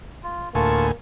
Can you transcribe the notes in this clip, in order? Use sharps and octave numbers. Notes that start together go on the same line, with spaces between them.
F4
D2 A2 A#3 F4 G#5 A5 C#6